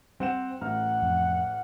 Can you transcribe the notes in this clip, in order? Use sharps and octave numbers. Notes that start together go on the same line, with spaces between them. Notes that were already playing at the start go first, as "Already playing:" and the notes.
G3 C4 F#5 E7
A1 F#5 A#5 F6
F2